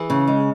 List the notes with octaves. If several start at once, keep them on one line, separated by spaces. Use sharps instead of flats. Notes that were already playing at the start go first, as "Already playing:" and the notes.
Already playing: E3 G#4
C#3
G#3